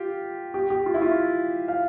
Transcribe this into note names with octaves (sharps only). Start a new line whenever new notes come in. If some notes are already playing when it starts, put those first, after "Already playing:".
Already playing: F4 G4
G4
G4
F4
E4
F4
F5